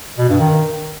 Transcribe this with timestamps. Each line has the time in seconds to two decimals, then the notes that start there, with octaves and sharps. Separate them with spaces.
0.18 B2
0.29 G2
0.40 D#3